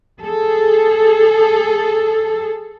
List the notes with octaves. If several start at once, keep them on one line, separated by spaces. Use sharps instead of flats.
G#4 A4